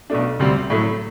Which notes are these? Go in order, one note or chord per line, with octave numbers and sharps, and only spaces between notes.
B1 B2 A3 D4
D2 C3 G3 C4
A2 F#3 A3